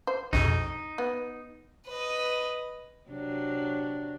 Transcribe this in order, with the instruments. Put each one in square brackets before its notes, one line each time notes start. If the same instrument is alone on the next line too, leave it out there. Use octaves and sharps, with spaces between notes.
[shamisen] C5
[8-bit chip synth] A#1 F2 B2 [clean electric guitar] D#4
[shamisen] B3
[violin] B4 D#5
[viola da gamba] C3 F#3 D4